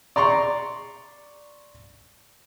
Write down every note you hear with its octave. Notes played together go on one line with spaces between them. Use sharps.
D5 A#5 C6 C#6